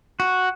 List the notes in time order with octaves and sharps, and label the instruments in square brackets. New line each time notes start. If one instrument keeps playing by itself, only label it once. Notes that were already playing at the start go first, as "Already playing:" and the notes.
[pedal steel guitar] F#4